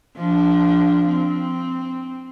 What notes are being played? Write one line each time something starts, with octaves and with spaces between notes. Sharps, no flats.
F3 D4
C4